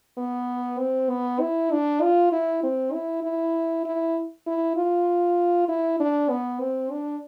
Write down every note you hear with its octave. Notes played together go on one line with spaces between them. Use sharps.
B3
C4
B3
E4
D4
F4
E4
C4
E4
E4
E4
E4
F4
E4
D4
B3
C4
D4